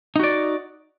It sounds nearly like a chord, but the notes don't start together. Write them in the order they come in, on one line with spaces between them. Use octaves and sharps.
D#4 F#4 D5